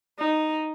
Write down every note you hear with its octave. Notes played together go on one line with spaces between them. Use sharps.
D#4